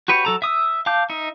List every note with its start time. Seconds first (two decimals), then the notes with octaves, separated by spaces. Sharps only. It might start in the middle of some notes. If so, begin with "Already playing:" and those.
0.08 F#4 G4 B4 C#5
0.25 F#3 A4 A#5
0.42 E5 D#6 E6
0.86 F5 A5 D6 G6
1.10 D#4 E5